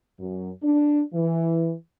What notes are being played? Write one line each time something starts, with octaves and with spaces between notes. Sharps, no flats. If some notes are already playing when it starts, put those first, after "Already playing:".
F#2
D4
E3